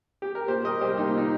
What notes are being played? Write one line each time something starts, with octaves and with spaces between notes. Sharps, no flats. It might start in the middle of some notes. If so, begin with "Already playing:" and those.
G4
A#4
A#2 G4 C5
G3 A#4 D#5
C2 G4 C5
A#3 D#4
A#2 D#4